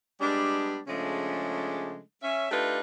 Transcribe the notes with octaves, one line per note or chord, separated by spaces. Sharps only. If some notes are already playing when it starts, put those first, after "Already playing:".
G3 G#3 B3 D4
C#3 F3 G#3 A3 C#4 D4
C#4 E5
A3 D4 D#4 F4 G4 B4